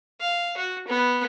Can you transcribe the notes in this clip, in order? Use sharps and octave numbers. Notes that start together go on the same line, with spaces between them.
F5
F#4
B3